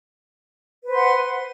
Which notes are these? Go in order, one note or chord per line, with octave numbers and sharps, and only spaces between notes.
B4 C5 F#5 C6